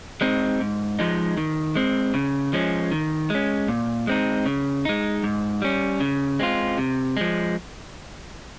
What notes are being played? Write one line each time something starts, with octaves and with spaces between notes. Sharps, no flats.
G#3 C4 D#4
G#2
F3 G#3 D#4
D#3
G#3 C4
C#3
F3 G#3 C#4
D#3
G#3 C#4
A#2
G#3 C4 D#4
C#3
G#3 D#4
G#2
G3 C#4
C#3
G#3 C4 F4
C3
F3 G#3